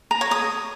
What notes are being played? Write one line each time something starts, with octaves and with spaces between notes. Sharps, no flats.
A#5
C#5
D#6